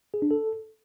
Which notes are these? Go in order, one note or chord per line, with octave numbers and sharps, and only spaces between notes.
G#4
D4
A4